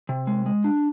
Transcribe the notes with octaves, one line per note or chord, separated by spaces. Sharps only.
C3
G#3
G#3
D4